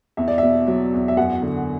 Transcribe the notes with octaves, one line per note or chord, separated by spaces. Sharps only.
E2 E5
D5
B2 E5
F#3
E2
E5
F#2 F#5
D3